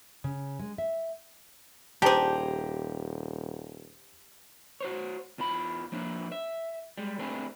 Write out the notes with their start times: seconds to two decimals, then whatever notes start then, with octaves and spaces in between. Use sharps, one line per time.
0.24 C#3
0.59 G#3
0.78 E5
2.02 D#1 D4 G4 G#4 C5 A#5
4.81 F#4 C5 C#5
5.38 E2 E3 F4 B5
5.92 F3 A#3 D4 E4
6.32 E5
6.98 G3 G#3
7.19 A3 C4 D4 E4 G4 G#4